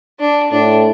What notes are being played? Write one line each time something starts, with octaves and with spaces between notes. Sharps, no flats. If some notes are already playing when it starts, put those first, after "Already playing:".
D4
A2 D4